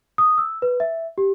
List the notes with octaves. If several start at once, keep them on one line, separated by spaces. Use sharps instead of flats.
D#6
E6
B4
E5
G4